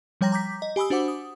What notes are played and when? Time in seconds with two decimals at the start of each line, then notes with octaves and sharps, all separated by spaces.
0.21 F3 G3 C#5 G5 A#5 A#6
0.32 A#5 D6 G6 B6
0.62 D#5
0.76 G4 G#5 B5 D#6 E6
0.90 D4 F#4 C5 F#5 D6
1.08 D#6